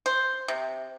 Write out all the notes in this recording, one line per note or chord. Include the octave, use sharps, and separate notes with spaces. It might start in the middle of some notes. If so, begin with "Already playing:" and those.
C5
C3